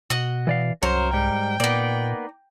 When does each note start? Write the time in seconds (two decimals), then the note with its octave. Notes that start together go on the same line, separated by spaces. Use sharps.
0.10 B2 F#4 D#5
0.47 E3 D5 F5
0.83 C2 F#2 F#3 A#4 C5 C#5
1.13 G#2 G3 G5
1.60 A#2 A#3 B3 D#4 D5